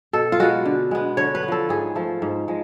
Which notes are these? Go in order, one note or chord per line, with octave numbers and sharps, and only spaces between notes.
B2 A4
F4
G#3 B3 F#4
D3
G#3 B3
D3 C#5
B4
B3
F3 A4
G#2 G#4
F3 A3
G#2
F3 G#3